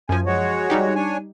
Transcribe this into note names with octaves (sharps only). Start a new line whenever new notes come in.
F#2 F3 G#5
G#3 F#4 C#5
G3 D#4 G4
D4 C#5 G#5